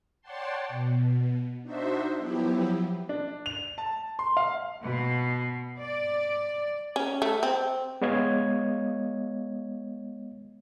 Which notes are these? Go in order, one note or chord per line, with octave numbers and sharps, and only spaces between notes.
C#5 D5 F#5 G5 A5 C6
B2
D4 D#4 F#4 C5 E5
F3 F#3 B3 E4 G4
D4
F7
A5
C6
F5
B2
D5
C#4
A3
C4
G#3 B3 C#5 D#5 F5 G#6